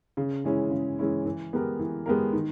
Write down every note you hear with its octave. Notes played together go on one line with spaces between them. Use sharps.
C#3
E3 G#3 C#4 E4
C#3
E3 G#3 C#4 E4
E3
G#3 B3 G4 A#4
E3
G#3 B3 G4 A#4
D#3